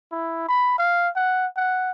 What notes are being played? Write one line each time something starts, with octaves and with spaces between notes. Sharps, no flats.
E4
B5
F5
F#5
F#5